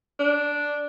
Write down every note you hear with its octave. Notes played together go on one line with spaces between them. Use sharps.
D4